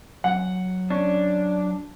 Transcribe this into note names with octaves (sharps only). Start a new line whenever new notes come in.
F#3 F#5
C#4 D4